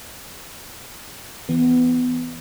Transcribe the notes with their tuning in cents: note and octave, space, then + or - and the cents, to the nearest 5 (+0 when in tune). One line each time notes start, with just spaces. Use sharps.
E3 +0 B3 +20